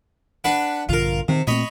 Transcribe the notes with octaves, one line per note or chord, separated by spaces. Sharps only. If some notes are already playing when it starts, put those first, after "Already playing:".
D4 B4 F#5
A#1 G2 D3 F4 A#4
C3 D#3 C4
A#2 A3 C4 C#5 D#5 B5